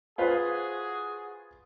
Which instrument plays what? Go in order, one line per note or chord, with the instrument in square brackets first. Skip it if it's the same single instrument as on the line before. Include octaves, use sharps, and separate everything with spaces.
[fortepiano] F4 B4 C5 [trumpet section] F#4 G#4